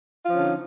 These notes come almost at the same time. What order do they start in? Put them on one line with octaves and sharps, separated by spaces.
F4 F3 C#4 D3 D#4